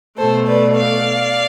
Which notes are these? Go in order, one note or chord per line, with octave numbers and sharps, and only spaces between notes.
B2 A3 A4 C5
B4 D5
D5 F5